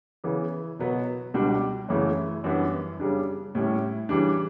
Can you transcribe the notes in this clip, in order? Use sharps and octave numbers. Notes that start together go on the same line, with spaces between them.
C#3 E3 B3
B2 F#3 B3
C#2 B2 G3 D4
F#2 C#3 E3 A3
F#2 E3 G3 B3 D4
C#3 G3 D4
A2 G3 C#4 E4
C#3 E3 G3 D4